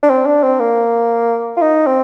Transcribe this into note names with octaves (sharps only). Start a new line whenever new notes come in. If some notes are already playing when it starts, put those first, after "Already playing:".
D4
C4
D4
C4
A#3
F4
D#4
C4